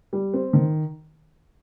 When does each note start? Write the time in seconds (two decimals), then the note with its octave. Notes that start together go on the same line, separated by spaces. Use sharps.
0.13 G3
0.33 C4
0.53 D#3